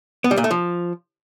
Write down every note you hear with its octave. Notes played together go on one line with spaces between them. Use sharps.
B3
G3
A#2
A3
F3